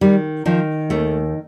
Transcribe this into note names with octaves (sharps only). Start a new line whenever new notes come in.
D#3 G3
D#3 F3
D#2 A3